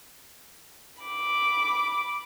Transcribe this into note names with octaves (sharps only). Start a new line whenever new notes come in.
B5 D6